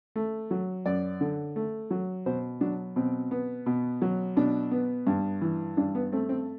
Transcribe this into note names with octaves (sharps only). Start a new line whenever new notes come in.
A3
F#3
F#2 D5
D3
A3
F#3
B2 C5
F#3 D4
B2 C4
B3
B2
F#3
B2 D4
B3
G2
E3
G2 D4
B3
A3 C4
C4